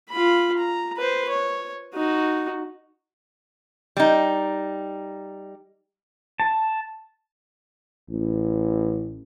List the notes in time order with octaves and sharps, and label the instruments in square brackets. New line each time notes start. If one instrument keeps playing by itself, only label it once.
[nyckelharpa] F4 B5
A#5
B4 C5
C#5
D#4 F#4
[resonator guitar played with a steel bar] G3 D#4
[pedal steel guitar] A5
[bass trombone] A1